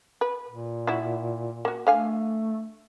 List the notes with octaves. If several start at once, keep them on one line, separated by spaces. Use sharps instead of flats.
B4
A#2
E4 F#4
A#3 F#4
D3 A3 F5 G#5